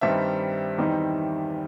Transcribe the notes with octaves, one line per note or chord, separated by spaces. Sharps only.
G2 D#3 G3 C4 D#4 E5
E2 D#3 G3 C4 D#4